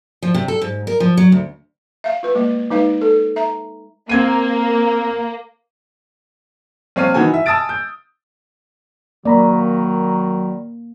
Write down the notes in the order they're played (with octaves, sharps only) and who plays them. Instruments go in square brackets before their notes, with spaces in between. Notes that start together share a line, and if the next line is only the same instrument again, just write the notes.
[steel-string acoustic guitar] F3
C3
A4
G#2
A#4
F3
F#3
D2
[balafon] E5 F5
F4 B4
G#3 A#3
G#3 D#4 B4 F5
A4
E5 A#5
[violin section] A#3 [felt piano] C4 G#6 D#7
[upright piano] A#1 C4 C#5 F5 D#7
D#3 E3 F#4 G#5
E5
G#5 A5 D#6 E6 A6 D7
G6
[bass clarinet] D#3 [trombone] F#3 [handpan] A#3 [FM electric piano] D5 A#5 B5